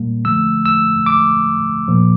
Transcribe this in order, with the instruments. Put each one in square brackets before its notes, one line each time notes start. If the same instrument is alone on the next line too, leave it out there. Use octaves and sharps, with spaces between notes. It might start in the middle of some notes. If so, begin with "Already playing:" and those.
Already playing: [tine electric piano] A#2 G3 A#3
D3 F3 A3 E6
E6
D6
A#2 F3 A#3